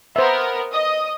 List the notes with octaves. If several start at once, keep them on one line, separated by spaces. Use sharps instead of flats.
B3 A#4 C5 E5
D#5 D#6